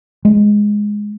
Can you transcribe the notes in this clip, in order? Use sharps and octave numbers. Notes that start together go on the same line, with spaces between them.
G#3